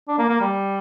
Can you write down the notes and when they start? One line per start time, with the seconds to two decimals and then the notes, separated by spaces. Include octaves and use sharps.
0.08 D4
0.18 A#3
0.29 A#3
0.41 G3